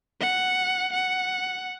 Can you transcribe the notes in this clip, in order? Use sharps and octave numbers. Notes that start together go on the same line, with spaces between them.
F#5
F#5